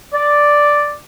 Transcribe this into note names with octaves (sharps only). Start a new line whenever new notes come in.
D5